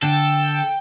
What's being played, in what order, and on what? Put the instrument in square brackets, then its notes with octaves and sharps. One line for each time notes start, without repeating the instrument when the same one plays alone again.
[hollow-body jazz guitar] D3 [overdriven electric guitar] A4 [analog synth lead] G5